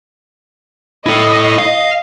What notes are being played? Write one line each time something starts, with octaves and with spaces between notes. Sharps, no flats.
E4 A4 D#5
F5